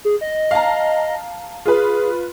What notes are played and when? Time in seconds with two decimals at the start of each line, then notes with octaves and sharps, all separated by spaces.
0.05 G#4
0.21 D#5
0.51 F5 A5 A#5
1.66 F4 G#4 B4